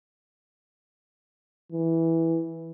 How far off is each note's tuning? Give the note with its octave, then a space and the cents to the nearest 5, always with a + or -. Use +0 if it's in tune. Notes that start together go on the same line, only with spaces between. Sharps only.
E3 -5